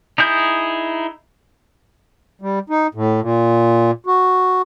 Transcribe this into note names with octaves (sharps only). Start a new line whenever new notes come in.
D#4 E4 G#4 G6
G3
D#4
A2
A#2
F#4